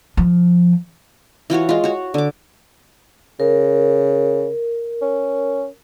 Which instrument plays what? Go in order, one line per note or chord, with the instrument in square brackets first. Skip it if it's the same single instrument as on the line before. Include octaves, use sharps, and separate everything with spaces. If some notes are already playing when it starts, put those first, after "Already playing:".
[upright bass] F3
[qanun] E3 F4 F#4 C#5
G#3 F4
F#4 C#5
D3 D6
[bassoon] C#3 [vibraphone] A#4
[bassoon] C#4